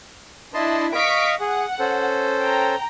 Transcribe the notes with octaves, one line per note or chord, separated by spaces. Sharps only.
D4 E4 D#5 A5 C6
D#5 F5 C#6 B6 D7
G#4 F#5
C#4 A4 C5
G5 A#5